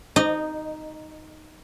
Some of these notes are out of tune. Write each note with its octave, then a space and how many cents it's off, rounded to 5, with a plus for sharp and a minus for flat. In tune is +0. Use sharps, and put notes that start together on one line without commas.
D#4 +0 D#5 -20